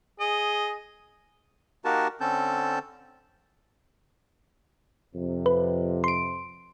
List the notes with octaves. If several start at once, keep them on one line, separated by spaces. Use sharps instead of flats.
G#4 D#5
A#3 D#4 F#4 G4 A#4 A5
D3 C4 C#4 A4 A5 G6
F2 C3
B4
C6 D7